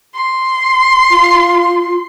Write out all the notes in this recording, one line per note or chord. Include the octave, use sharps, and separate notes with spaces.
C6
F4